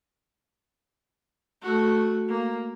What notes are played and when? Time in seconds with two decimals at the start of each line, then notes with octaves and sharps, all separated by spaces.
1.62 A3 F#4
2.28 A#3